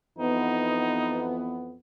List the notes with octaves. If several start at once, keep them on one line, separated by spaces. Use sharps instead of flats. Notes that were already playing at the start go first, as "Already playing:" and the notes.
F2 E3 B3 D#4